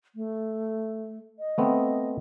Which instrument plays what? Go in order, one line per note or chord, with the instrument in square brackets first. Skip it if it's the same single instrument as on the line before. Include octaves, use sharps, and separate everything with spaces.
[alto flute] A3
D#5
[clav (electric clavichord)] A3 B3 C4